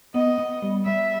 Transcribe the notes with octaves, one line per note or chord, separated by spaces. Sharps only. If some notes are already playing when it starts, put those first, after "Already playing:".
B3 D#5
B3
G3
G3 E5